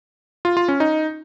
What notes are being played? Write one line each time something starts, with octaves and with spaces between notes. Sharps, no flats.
F4
F4
C#4
D#4